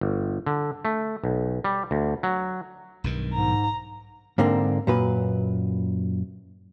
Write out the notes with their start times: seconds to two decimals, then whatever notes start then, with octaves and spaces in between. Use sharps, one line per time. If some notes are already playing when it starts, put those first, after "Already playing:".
0.01 G1
0.46 D3
0.85 A3
1.24 B1
1.64 G3
1.91 D2
2.23 F#3
3.04 B1 G2 D#3
3.34 G#2 A#5
4.38 G#2 D3 A#3 C4 D4
4.87 F#2 A#2 B4